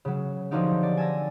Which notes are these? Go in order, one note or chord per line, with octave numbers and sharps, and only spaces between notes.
C#3 F#3
D3 F3 F#3 C4 D#4 G4
D5
G#5 A5 E6 A#6